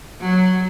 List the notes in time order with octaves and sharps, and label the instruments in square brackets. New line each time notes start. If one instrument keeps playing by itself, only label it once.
[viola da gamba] F#3